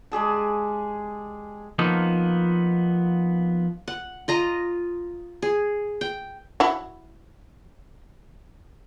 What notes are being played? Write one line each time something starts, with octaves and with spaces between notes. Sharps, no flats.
G#3 G4 G#4 A5
F3 A#3 B3 D#4
F#5
F4 D#5 A#5
G#4
G5
E4 F#4